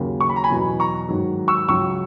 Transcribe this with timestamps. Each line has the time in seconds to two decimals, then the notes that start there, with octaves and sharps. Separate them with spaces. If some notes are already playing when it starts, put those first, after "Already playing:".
Already playing: D#2 C#3 F#3
0.21 C#6
0.29 B5
0.36 A#5
0.44 G#5 B5
0.50 E2 B2 F#3
0.80 A#5 C#6
1.09 G#2 D#3 F#3
1.48 C#6 E6
1.68 C#2 C#3 F#3 C#6 E6